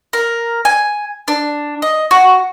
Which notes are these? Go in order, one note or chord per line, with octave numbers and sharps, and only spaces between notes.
A#4
G#5
D4
D#5
F#4